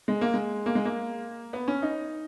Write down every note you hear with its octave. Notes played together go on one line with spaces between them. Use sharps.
G#3
A#3
G#3
A#3
G#3
A#3
B3
C#4
D#4